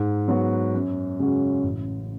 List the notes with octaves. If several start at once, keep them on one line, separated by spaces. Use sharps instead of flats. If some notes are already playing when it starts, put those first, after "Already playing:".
Already playing: G#2
F#3 B3 F#4
F#2
C#3 G#3 C#4 F#4
A1